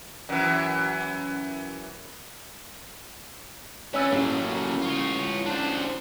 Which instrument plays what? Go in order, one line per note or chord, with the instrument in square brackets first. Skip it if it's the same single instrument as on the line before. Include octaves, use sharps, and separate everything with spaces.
[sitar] F#2 E3
[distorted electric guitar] C#4 B4 [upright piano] C#5 E6 A6
[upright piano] A1 G#4 [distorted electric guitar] F#3 A#3
[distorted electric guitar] F4 C#5
D4 C5